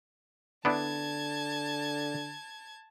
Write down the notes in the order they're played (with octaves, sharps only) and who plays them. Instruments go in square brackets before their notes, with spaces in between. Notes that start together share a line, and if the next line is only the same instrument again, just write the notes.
[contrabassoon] D3 [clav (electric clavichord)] B3 D4 E4 [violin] A5 G#6